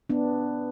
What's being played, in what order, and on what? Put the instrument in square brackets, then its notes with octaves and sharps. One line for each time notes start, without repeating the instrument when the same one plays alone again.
[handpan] B3 D4